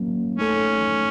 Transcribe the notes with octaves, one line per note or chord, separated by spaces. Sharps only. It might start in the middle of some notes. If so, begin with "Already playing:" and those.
Already playing: F#3 A#3 C#4
A3 C#4 D#4 A4